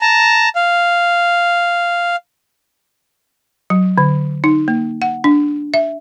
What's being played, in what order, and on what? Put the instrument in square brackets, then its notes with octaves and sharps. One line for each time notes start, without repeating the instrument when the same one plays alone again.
[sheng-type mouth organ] A5 A#5
F5
[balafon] F#3
D3
D#4
A#3
F#5
D4
E5